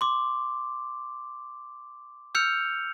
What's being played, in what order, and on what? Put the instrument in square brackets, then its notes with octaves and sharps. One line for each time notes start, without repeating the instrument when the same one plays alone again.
[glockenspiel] C6 D6
E6 F6 G6 C#7 F7